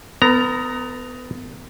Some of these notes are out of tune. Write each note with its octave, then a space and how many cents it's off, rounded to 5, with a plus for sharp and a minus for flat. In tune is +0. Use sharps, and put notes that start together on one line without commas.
B3 +25 A#4 -35 A#5 +0